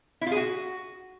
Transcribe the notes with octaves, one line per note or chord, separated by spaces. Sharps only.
E4
F4
G#4
F#4